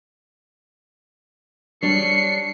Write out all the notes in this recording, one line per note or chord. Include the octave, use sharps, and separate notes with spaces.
G3 D4 C#5 C7 C#7